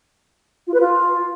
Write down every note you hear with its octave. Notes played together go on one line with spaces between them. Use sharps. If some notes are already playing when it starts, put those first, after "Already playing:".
F4
B4
F4